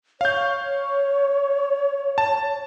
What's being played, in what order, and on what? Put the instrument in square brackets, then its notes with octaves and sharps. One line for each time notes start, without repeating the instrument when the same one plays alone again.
[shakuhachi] C#5 [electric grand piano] F5 G6
[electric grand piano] A5